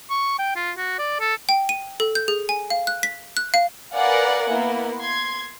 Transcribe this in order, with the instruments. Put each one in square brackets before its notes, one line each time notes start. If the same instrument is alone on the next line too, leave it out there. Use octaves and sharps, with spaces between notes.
[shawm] C#6
G5
F4
F#4
D5
A4
[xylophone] G5
D#7
A4
G6
G#4
G#5
F5
F#6
B6
F#6
F5
[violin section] A#4 B4 D5 F5 F#5 G#5
A#3 B3 E4 A#4
C6 G#6